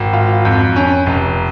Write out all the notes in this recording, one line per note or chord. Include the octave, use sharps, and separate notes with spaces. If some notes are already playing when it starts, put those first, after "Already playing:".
Already playing: G#1
F4
F2
C#4
F1